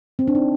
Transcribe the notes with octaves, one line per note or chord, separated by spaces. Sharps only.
C4
D4
D#4